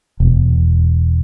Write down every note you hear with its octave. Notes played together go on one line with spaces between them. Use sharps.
E1